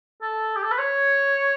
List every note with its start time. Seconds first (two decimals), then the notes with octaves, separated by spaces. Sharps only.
0.22 A4
0.56 G4
0.63 A4
0.71 B4
0.78 C#5